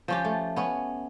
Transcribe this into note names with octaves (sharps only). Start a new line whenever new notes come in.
F3 C#4 G4
A3
B3 C#4